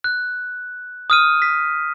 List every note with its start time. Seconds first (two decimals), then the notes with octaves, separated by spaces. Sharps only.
0.04 F#6
1.10 D#6 F6 D#7
1.42 B6